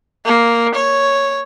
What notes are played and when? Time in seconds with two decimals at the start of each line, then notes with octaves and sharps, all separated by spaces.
0.25 A#3
0.75 C#5